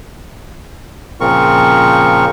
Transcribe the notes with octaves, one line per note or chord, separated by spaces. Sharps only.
A#2 C#3 F3 C4 A#4 C#6